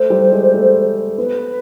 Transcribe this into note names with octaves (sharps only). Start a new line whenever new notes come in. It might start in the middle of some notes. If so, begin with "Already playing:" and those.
Already playing: A3 C5
G3
G#3
A3
B3 B4